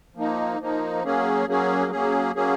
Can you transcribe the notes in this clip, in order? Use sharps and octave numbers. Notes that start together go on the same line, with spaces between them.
F3 A#3 D#4
F3 A#3 D#4
F#3 A#3 C#4 G#4
F#3 A#3 C#4 G#4
F#3 A#3 C#4 G#4
F#3 A#3 C#4 G#4